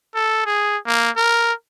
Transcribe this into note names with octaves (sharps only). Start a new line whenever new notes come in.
A4
G#4
A#3
A#4